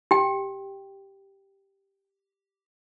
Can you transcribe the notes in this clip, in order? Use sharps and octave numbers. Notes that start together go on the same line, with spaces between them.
G4 G5